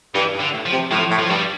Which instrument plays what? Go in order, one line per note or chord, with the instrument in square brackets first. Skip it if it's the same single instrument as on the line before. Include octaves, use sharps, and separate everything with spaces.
[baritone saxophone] G2 [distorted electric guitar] E3
[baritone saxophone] G2
[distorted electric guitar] D3
[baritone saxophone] A2
[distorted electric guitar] F3
[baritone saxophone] C3
[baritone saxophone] A2 [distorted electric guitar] F3
[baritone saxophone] A2
[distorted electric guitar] F3
[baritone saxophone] G2 [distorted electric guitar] G3